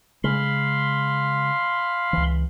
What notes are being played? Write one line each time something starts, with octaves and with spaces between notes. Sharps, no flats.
C#3 G#3 F5 B5 C6
C#2 E3